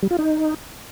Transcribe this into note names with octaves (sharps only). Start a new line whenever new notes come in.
G3
F4
D#4